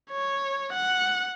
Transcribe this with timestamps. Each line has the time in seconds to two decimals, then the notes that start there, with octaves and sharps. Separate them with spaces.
0.11 C#5
0.73 F#5